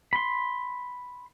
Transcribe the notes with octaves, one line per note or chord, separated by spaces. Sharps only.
B5 C6